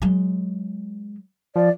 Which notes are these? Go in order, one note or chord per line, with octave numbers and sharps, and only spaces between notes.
F#3 G#3
F3 D5